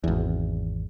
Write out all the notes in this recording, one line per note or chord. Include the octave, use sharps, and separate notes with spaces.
G#1 E2